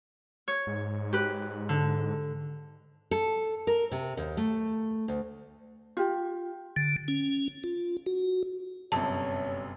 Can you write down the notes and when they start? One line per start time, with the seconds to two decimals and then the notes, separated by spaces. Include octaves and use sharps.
0.48 C#5
0.67 G#2
1.13 G4 B4
1.69 D3
3.11 A4
3.67 A#4
3.91 C3
4.17 D#2
4.37 A3
5.08 D2
5.97 F4 G4
6.76 D3
7.08 C#4
7.64 F4
8.06 F#4
8.92 G1 F#2 C3 C#5 A5